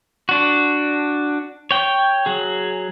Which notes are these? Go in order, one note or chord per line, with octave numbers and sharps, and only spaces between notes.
D4 F#4
C#5 G5
F#3 G#4